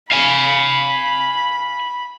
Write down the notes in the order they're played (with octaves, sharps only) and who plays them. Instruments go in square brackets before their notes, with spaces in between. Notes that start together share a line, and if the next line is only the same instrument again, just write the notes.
[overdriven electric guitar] F5 G#5 [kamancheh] B5